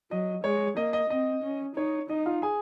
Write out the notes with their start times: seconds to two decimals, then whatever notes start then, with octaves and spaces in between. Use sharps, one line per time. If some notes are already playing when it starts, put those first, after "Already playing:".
0.11 F#3 D#5
0.44 G#3 C#5
0.77 A#3 D#5
0.93 D#5
1.10 C4 D#5
1.43 C#4
1.76 D#4 C#5
2.10 D#4 D#5
2.26 F4 F5
2.42 G#4 G#5